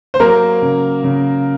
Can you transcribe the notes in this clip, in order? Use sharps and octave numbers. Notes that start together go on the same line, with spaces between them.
C5
F#3 A#3 A#4
C#3
C#3